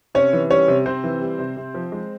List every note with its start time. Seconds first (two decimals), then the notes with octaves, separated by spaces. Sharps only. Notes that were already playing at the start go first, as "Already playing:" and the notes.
0.15 C3 C#4 C#5
0.33 E3
0.51 G3 C#4 C#5
0.68 C3
0.86 C3 C4 C5
1.04 E3
1.21 G3
1.39 C3
1.57 C3
1.75 F3
1.92 G#3